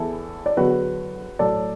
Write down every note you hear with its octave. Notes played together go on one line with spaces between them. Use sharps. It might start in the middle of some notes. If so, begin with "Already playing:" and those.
Already playing: E2 E3 E4 A4
D5
E2 D3 F#3 F#4 B4
A2 F#3 A4 D5